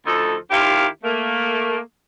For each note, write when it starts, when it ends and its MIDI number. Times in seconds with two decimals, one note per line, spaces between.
0.06 0.36 38
0.06 0.36 53
0.06 0.36 63
0.06 0.36 69
0.51 0.86 39
0.51 0.86 51
0.51 0.86 64
0.51 0.86 65
0.51 0.86 67
0.51 0.86 77
1.04 1.78 57
1.04 1.78 58